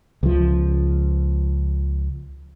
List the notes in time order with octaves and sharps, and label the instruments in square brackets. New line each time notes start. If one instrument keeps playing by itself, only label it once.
[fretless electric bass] C#2 F3